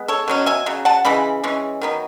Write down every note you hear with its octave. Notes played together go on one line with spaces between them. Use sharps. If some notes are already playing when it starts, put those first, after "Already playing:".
Already playing: G#3 B3
A4 C#5
B2 F#3 C#4
E5 G#5
C#3 F#3
F#5 A5
C#3 E3 G#3 B5
E3 G#3 C#4
D#3 F#3 B3